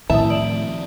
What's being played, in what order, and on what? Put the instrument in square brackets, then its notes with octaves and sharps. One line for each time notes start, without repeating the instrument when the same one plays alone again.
[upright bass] A2 [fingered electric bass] D#3 F3 C4 [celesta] E4 D#6 [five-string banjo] E5 A5
[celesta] D5 D7 F#7